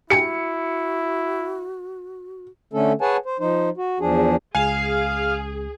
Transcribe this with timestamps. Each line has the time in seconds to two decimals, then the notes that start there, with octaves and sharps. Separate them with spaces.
0.10 E4 F#4 G4 G5 G#5 C#7
2.73 D3 A3 C#4 A4
3.01 G#4 B4 C#5 F#5 G#5 A5
3.26 C5
3.40 F3 D#4 C5
3.77 F#4
4.00 E2 F3 D4 G#4
4.55 C#2 G#4 F5 G#5